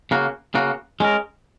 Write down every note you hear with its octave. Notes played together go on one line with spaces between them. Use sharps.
C#3 A#3 F#4
C#3 A#3 F#4
G#3 C#4 A#4